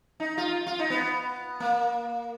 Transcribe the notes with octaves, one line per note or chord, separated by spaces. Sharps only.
D#4
F4
F4
D#4
B3
A#3